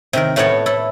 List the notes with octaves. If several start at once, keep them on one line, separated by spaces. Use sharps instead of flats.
C3 D#3 A#4
A2 A3 B3 F#4 C#5 A5
E4 A4